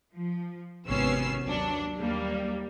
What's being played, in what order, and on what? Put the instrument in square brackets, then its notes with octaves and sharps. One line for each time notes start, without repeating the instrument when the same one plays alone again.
[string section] F3
G#1 C3 B3 C#4 E6 C7
D#2 F#3 D4
D#2 G3 A#3